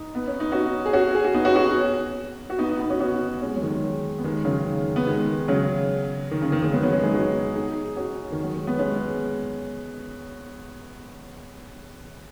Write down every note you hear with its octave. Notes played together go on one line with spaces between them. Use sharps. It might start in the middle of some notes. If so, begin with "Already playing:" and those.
Already playing: D#4
B3
C#4
D#4
C#4 F#4
G#4
C#4 F#4
G#4
F#4
B3 D#4
C#4 F#4
C#4 F#4
F#4
B3 D#4
B3 D#4
B3 D#4
C#4 F#4
C#4 F#4
G#3 C#4
F#3
D#3 G#3
B3
D#3 G#3
C#3 F#3
D#3
B3
D#3 G#3
C#3 F#3
D#3
C#3
D#3
D#3 G#3
F#3 B3
F#3 B3
G#3 C#4
D#4 G#4
C#4 F#4
D#4 G#4
C#4 F#4
D#3
F#3
G#3
B3
G#3 C#4